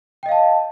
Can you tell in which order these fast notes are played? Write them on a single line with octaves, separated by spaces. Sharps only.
G5 D#5 F5 A5